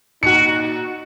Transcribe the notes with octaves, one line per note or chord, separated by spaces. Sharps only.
A#2 D#4 F#4 C#7